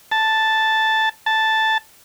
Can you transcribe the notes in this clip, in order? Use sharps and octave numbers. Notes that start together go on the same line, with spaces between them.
A5
A5